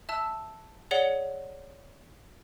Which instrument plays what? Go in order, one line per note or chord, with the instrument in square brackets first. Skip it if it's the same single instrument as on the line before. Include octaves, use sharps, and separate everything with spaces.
[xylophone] E5 A5 E6
G#4 C#5 D5 F#5 C#7 G7